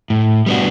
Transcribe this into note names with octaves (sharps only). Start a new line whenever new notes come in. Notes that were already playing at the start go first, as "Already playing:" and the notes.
A2
G3 B3 D4 F#4